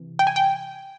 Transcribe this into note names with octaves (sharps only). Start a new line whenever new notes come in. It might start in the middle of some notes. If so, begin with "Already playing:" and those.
Already playing: C3 E3
G5
G#5
G5